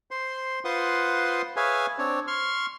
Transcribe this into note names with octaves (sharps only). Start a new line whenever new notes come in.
C5 C6
F4 B4 C5 F#5 C6 D#6
G#4 B4 C#5 E5 F5 G#5
C4 D4 C#5
C6 C#6 F6